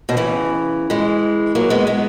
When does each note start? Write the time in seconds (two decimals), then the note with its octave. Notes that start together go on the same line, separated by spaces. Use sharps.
0.09 B2 D#3
0.17 C#3 E3
0.90 E3 G#3
1.55 F#3 A#3
1.70 G#3 B3
1.87 G#3 B3